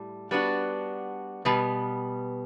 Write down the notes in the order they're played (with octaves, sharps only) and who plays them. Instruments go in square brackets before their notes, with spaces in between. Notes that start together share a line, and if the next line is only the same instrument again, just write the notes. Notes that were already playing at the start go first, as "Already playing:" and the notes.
Already playing: [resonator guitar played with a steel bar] A2 G3
G3 B3 D4 F#4
B2 G3 B3